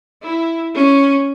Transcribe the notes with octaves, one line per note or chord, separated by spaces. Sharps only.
E4
C#4